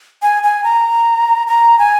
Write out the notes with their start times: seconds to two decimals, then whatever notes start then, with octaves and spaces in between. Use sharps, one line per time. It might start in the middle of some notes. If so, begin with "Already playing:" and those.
0.22 G#5
0.43 G#5
0.64 A#5
1.47 A#5
1.79 G#5